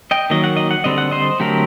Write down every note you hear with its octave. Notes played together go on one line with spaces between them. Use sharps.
D#5 G5
D#3 F#3 A#3 D#5
F#5
D#5
F#5
D3 G3 C4 D#5
F#5
C5 D#5
D3 F#3 A3 C4 G4 A#4